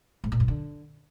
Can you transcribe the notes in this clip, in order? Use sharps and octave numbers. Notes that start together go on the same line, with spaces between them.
G#2
A#2
G2
D3